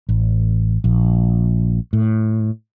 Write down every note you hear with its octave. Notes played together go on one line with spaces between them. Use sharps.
A1
A#1
A2